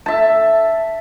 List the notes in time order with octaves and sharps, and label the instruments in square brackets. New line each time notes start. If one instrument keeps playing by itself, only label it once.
[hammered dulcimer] E5 A5